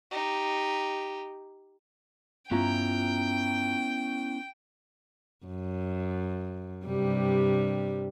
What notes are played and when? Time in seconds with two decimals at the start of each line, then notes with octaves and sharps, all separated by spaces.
0.11 D#4 G4
2.51 G2 B3 C#4 E4 F4 G5 A#5
5.46 F#2
6.86 G2 C3 G3